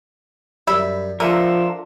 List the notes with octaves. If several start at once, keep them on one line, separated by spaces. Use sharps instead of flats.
F#2 G3 E5 B5
D3 F3 F4 A4 A#4 D5 E5